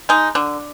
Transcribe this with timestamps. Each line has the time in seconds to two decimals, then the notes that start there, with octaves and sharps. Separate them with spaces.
0.09 G#3 D#4
0.35 D3 D4